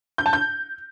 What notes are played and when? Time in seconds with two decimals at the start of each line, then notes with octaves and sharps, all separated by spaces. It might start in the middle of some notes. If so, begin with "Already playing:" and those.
0.18 G6
0.26 A5
0.33 G6